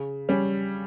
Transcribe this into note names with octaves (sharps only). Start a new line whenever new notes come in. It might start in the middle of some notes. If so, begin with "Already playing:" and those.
Already playing: C#3
G3 C#4